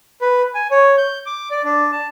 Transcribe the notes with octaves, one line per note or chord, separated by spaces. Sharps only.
B4
G#5
C#5
G6
D6
D5
D4
A5